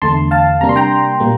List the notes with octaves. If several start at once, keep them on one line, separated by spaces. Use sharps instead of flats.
E2 D3 A3 A5 C6
F5 A5
C3 G3 A#3 D4 A#5
C6
G5 A#5
A#2 G3 A#3